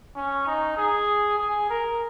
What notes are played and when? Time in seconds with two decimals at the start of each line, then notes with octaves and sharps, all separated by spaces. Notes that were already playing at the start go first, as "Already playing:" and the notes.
0.16 C#4
0.46 D#4
0.77 G#4
1.39 G#4
1.70 A#4